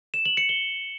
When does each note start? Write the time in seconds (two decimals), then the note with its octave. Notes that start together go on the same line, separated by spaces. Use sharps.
0.14 E7
0.26 F#7
0.37 C#7
0.49 G7